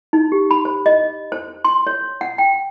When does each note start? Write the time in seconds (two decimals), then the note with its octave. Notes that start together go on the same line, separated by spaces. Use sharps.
0.13 D#4
0.32 G4
0.51 B5
0.65 C5
0.86 D#5
1.32 C5
1.65 C6
1.87 C#5
2.21 F#5
2.38 G5